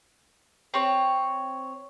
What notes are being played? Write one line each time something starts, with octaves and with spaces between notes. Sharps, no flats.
C4 C#5